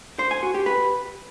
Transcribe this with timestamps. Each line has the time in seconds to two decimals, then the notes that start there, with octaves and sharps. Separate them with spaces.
0.19 C5
0.31 G#5
0.43 F#4
0.54 G4
0.66 B4